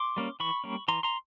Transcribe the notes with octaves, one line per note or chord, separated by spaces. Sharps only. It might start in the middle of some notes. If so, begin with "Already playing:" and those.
Already playing: C6 D6
G3 A#3 C#4
E3 B5 C#6
G3 A#3 C#4
E3 A#5 C6
A#5 C6